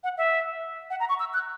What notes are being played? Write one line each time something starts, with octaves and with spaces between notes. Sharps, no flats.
F#5
E5
F#5
A#5
C#6
E6
F#6